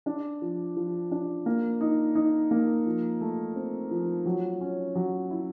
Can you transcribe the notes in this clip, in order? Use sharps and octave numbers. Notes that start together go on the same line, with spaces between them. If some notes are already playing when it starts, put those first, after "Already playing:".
D4
F3
F3
D4
A#3
D#4
D#4
A#3
F3
A3
C4
F3
F#3
C#4
F#3
E4